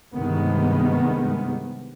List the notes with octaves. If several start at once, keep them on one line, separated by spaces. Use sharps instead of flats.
G2 C3 D#3 G#3 B3